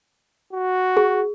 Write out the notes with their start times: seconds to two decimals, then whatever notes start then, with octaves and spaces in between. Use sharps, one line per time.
0.53 F#4
0.97 G#4